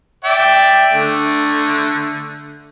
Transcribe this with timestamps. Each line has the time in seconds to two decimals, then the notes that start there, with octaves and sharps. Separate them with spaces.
0.24 D5 E5 G5
0.94 D3 A3